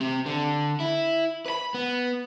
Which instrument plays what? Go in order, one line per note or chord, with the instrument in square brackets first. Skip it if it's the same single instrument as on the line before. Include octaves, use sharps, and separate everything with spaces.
[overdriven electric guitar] C4 G4
D3
E4
B4 B5
B3